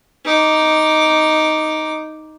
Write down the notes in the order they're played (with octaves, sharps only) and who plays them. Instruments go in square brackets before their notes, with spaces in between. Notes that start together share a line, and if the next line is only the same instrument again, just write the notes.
[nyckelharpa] D#4 D6